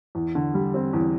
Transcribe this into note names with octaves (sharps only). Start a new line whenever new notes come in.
E2
D3
G3
C4
E2